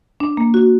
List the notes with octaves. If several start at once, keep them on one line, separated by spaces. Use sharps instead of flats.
D4
A#3
F#4